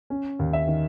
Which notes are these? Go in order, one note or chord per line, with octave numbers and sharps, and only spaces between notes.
C#4
D#2
E5
D#3